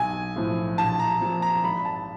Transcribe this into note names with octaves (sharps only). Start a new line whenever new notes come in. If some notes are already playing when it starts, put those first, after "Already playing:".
Already playing: B1 G#5
A2 F3
A#1 A5
A#5
A#2 F3
A#5
G#1 B5
A5